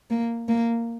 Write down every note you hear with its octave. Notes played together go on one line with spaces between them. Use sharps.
A#3
A#3